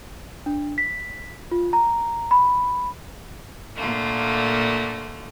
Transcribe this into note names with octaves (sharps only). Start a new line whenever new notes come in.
D4
B6
F4
A#5
B5
A#2 D3 A3 A#3